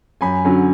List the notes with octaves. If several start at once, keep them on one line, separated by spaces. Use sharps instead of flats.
F#2 G#5 B5
D3 F#3 C#4